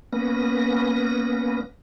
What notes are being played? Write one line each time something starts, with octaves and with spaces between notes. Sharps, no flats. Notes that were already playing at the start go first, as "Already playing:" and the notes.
A#3 B3 C#4 B4 A#6